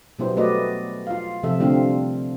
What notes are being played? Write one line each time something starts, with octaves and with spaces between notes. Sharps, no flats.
B2 F#3 G3 B3 E4 C5
A3 B3 F#4 B4 D5 D#5
F4 F5
C3 F3 A4 E5
D3 G3 A3 C4 F4 F5